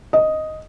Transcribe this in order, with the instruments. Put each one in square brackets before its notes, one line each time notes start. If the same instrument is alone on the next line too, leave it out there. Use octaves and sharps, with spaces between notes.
[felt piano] D#5